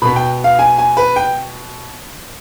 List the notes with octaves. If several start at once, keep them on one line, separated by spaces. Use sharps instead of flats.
B2 B3 B5
G5
F5
G#5
G#5
B4
G5